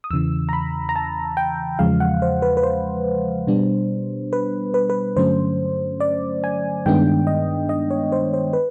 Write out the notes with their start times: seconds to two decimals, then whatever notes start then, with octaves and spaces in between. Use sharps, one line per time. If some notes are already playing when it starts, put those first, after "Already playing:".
0.04 D#6
0.11 E2 C#3 E3 E6
0.49 A#5
0.53 B5
0.89 A#5
0.96 A5
1.37 G5
1.79 E2 C#3 F3 G#3 F5
2.00 F#5
2.22 C5
2.42 B4
2.57 B4
2.63 C5
3.47 B2 G3 B3 D4
4.33 B4
4.74 B4
4.90 B4
5.16 G2 D3 F#3 A3 C#4 C5
6.00 D5
6.44 G#5
6.86 G2 D#3 G#3 B3 D4 G5
7.27 D#5
7.69 D#5
7.90 C#5
8.12 C5
8.33 C5
8.53 B4